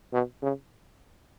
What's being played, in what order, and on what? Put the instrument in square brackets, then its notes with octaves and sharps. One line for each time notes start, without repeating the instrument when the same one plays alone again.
[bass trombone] B2
C#3